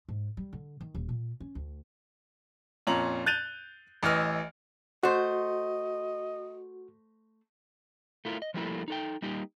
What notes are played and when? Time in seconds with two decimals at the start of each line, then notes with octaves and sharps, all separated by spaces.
0.08 G#2
0.37 G3
0.53 D3
0.81 D#3
0.94 D#1
1.09 A#2
1.40 C#4
1.55 D2
2.87 F2 A#2 C#4 A#5 F#7
3.26 F#6 G6 A6 D#7 F7
4.03 A1 E3 D#5 F6
5.03 A3 F#4 C5 D#5
8.25 A3 E4 F4 A#4
8.42 D#5
8.54 F3 G3 A3 A#3 E4 A4
8.88 D#4 A4 G5
9.22 G3 A#3 D#4 G4